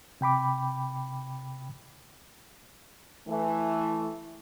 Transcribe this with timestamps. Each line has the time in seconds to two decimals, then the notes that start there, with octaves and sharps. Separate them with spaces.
0.21 C3 G5 B5 D6
3.28 E3 A3